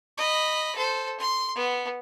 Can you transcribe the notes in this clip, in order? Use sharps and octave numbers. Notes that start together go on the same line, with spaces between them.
D#5 B5
A4 C5
C6
B3